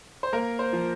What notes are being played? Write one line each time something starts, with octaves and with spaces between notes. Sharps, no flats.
C5
A#3 A#4
C5
F3